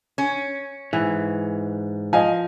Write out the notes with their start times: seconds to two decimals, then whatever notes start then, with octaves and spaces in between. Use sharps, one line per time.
0.18 C#4
0.93 G#2 E3
2.13 F3 D#5 F5 G#5